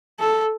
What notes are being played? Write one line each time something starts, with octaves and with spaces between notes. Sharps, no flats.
A4